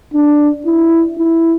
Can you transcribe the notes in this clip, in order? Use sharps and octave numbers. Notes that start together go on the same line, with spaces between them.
D4
E4
E4